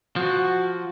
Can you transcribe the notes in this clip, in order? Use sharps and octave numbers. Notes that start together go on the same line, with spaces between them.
F3 F#4